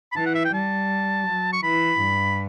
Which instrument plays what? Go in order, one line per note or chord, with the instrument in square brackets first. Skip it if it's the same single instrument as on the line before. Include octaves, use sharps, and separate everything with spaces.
[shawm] B5
[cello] E3 [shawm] A5
[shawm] F#5
E5
G5
[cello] G3 [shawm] A5
[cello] F#3
[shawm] C#6
[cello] E3 [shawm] B5
[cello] G2